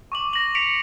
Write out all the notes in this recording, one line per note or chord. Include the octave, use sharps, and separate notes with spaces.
C#6 D6 F#7
A#6 F#7
B6 C#7 D7 F7